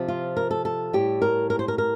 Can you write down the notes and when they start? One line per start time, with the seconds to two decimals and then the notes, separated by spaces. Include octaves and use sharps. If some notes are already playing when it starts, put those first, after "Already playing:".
Already playing: C3 F3
0.08 F4
0.37 A#4
0.51 A4
0.65 A4
0.93 A2 G3 G4
1.22 A#4
1.50 A#4
1.59 C5
1.68 A#4
1.78 A#4